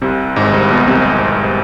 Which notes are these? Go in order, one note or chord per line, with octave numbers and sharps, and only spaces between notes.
C2 C3
G#1 G#2
C2 C3
B1 B2
C2 C3